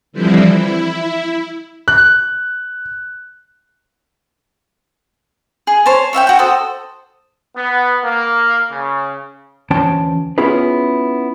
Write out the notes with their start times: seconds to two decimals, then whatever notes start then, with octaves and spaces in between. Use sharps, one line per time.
0.12 D3 E3 F3 G3 C4 E4
0.51 E4
1.88 F#6
5.67 G#4
5.86 C5 C#5 A5
6.13 C#5 E5 F5 G5
6.27 F#4 G5
6.39 A4 C5 D#6
7.55 B3
8.04 A#3
8.69 C#3
9.70 D2 E3 C#4 C5 G5 A5
10.38 B3 C#4 E4 F4 G#4 B4